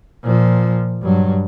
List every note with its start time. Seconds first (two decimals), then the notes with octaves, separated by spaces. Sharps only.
0.24 A#2 F3
1.02 G2 F#3